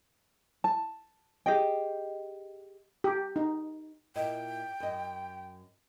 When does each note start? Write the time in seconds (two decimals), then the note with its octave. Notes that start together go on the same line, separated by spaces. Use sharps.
0.64 A5
1.46 G4 G#4 D#5 G5
3.04 G4
3.36 D#4
4.16 A#2 E4 D#5 G5
4.80 F#2 D#5